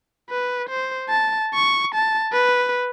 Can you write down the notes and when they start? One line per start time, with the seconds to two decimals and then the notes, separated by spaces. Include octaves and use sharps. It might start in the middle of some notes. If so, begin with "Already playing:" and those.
0.30 B4
0.69 C5
1.09 A5
1.54 C#6
1.95 A5
2.33 B4